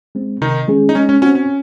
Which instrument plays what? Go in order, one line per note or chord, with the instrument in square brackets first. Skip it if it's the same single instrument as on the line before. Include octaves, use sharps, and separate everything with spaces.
[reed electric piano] G#3 C4
[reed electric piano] C3 [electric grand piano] D#3 D#4
[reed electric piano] D#3 G#3 C#4 G#4
[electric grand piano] D#4
[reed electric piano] G#3 [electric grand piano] C#4
[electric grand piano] C#4
[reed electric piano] C4 F#4 [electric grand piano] C#4
[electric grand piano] C#4